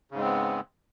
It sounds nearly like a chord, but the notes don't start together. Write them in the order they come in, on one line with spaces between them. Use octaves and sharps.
C#3 G#2 G#3 C4 B3